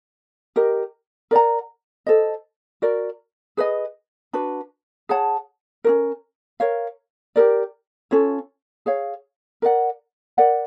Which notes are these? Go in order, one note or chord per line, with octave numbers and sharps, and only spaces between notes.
G4 A#4 D#5
A#4 D5 F#5 A#5
A4 C5 D#5
F#4 A#4 D5
G#4 B4 D#5
D4 F#4 B4
G#4 C#5 F#5 A5
C#4 F#4 A#4
A#4 C#5 F5
G4 A#4 D5
C#4 F4 A4 C#5
G#4 C#5 F5
A#4 D5 F#5
A#4 D5 F#5